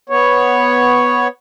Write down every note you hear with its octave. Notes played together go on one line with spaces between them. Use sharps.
B3 C#5